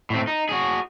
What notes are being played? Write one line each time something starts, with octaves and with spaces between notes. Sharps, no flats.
A2 C4
D#4
F#4 G#4